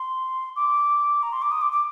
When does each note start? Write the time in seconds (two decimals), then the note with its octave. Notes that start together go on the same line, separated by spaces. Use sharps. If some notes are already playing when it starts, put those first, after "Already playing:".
Already playing: C6
0.56 D6
1.23 A#5
1.33 C6
1.42 D6
1.51 D#6
1.62 D6
1.72 D6